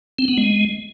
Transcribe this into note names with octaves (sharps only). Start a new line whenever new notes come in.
C4
B3
G#3